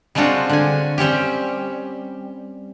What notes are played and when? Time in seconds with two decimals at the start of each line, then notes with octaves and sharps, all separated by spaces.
0.15 G3 G#3 C4 D4 F4 F#4
0.49 D3 G#5
0.98 G3 C4 C#4 G4